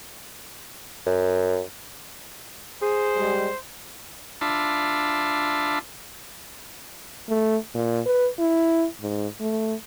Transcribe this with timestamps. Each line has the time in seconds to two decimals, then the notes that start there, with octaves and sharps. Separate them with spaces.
1.06 F#2
2.82 G#4 C5
3.16 G3 G#3
4.41 D4 F4 E5 A5 B5 C6
7.29 A3
7.75 A#2
8.06 B4
8.39 E4
9.02 G#2
9.41 A3